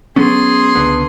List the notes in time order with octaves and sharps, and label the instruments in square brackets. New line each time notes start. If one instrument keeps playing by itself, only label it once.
[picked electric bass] F#3 B3 C#4 [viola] G#4 C6
[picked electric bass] C#2 D3 B3